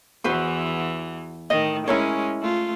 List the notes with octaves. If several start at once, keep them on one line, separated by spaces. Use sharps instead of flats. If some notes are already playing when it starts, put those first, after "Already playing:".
E2 E3 F#4 B4 C5
A2 D#3 D#5
G#3 C#4 E4 A#4 C#5
A3 F4